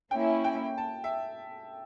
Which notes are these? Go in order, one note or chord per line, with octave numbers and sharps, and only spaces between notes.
A#3 C#4 E4 G5
G5
A5
E5